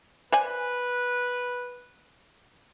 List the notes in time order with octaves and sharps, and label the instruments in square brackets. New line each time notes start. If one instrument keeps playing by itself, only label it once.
[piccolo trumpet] B4 [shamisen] C5 D5 G#5